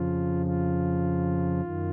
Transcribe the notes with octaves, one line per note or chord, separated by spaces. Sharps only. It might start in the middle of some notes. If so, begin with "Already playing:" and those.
Already playing: F2 C#3 F3 F4
F4
F#2 D#3